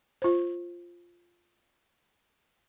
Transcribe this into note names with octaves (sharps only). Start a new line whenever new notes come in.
F4 C5